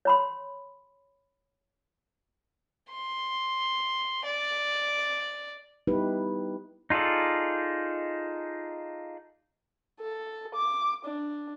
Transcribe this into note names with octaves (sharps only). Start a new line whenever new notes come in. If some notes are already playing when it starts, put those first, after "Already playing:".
C#5 B5 C6
C6
D5
G3 B3 D#4 E4 G4 B4
D#4 F4 G#4 A4 D5
A4
D6
D4